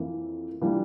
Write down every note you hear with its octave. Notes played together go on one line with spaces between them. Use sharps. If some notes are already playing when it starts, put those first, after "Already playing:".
Already playing: F2 E3 A#3
E3 G3 A#3 D4 F4